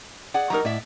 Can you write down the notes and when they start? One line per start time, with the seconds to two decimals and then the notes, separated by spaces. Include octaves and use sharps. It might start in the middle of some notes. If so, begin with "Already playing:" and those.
0.34 G#4 D5 F#5
0.50 F#3 G3 D#4 A#4 A#5
0.65 A2 D5 E5